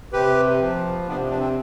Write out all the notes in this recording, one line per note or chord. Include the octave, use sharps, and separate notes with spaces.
C3 G4 B4
F3
C3 B3 D4
D4
C4